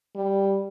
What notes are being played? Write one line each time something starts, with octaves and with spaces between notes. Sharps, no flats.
G3